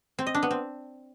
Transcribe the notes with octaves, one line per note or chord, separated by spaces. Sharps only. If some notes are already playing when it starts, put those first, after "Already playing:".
C4
D#5
D4
B3
C4